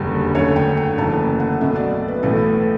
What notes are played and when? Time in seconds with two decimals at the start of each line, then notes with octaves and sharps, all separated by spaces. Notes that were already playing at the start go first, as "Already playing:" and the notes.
Already playing: F#1 E2 D3 G3
0.35 F#2 D3 A3 C#5
0.56 G5
0.77 G5
0.98 F#1 F#2 E3 A3 A5
1.40 F#5
1.61 B1 B2 F#3 A3 E5
1.76 D5
2.08 B4
2.23 B1 A2 E3 A3 A4
2.44 B4